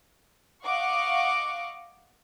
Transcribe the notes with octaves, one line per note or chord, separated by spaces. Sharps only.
D#5 F5 F#5 C#6 D6